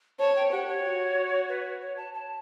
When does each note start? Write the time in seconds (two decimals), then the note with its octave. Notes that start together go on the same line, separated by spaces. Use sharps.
0.19 C#5 A5
0.36 G5
0.52 G4 F#5
0.68 C#5
0.84 F#4
1.49 B4
1.81 C#5
1.97 A5
2.14 A5